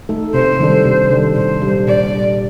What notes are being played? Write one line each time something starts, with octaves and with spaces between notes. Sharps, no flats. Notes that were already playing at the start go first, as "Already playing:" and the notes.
A3 D#4 A4
C3 C5
D#3 G3 D4 A4
C3
D#3 G3 D4 A4
A#2 C5
G3 D4 G4
A#2 D5
G3 D4 G4